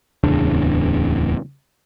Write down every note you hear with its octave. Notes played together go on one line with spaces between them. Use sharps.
D1 E2 C#3 D4